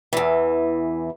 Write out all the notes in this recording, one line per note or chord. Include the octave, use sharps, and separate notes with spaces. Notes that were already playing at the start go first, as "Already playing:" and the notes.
E2 E3